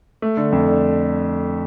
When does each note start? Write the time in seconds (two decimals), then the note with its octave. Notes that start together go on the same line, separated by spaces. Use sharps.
0.22 A3
0.37 D3
0.52 F2
0.68 D3